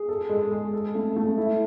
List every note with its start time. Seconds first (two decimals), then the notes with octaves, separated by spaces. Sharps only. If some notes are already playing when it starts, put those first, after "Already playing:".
Already playing: G#4
0.09 A4
0.30 G#3
0.52 G#3
0.73 A4
0.95 A3
1.16 A3
1.37 E4